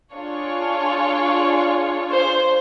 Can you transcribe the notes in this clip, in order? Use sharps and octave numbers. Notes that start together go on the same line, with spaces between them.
D4 F4 G#4 C#5
C5